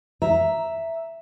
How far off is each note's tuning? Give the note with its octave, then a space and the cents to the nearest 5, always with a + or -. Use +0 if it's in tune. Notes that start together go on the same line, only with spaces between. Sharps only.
E5 +0 A#5 +0